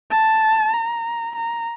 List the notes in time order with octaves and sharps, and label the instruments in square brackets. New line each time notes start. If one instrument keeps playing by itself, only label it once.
[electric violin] A5
A#5
A#5